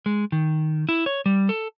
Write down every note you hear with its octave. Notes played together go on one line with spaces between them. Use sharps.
G#3
D#3
E4
C#5
G3
A4